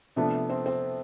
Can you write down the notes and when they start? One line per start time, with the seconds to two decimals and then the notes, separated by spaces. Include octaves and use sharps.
0.16 C3 F3 A3 B3 D4
0.50 C4
0.66 C4